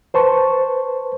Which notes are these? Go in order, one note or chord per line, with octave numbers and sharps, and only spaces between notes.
B4 C5 A5 C#6